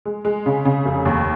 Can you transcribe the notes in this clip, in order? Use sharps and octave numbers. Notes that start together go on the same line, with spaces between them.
G#3
G#3
C#3
C#3
F1
D#2